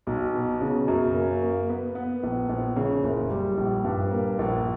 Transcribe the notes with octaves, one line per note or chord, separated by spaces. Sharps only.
B1
B2
C#3
F#2
A#3
A#3
B3
B3
A#1
A#1
C#3
F#1
G3
A#1
G2
A#3
A#1